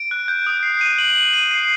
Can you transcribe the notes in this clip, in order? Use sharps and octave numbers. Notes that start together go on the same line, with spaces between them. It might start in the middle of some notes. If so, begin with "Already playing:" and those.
Already playing: D7
F#6
G6
D#6
C7
D#7
F#7
F#7
D#7
C7